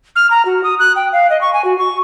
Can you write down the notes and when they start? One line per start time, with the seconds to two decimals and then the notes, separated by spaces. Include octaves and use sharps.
0.16 F6
0.30 A#5
0.45 F#4
0.64 D#6
0.79 F#6
0.96 G5
1.13 F5
1.30 D#5
1.41 C#6
1.53 G#5
1.64 F#4
1.78 C#6